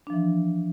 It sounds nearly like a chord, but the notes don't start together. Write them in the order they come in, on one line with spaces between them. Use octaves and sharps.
D4 F3 E3